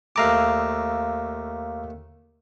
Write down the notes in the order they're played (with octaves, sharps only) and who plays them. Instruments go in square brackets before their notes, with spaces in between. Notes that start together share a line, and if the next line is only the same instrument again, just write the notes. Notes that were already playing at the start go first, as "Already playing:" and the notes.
[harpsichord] D#2 A3 A5 [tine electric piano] F5 A#5 D6